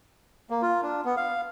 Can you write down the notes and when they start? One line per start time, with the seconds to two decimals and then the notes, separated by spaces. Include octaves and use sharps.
0.50 A#3
0.62 F4
0.83 D4
1.05 B3
1.17 F5